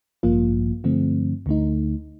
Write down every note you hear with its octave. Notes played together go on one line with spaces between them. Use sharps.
A1 G2 F3 A#3 F4
G2 D3 F3 A3 C4
D2 D3 A3 D#4